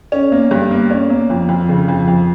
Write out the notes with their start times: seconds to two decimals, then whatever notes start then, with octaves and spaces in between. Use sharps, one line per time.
0.12 C#4
0.32 A#3
0.51 G2
0.71 A#3
0.91 C#4
1.10 A#3
1.30 F2
1.49 F2
1.69 C#3
1.88 F2
2.08 F2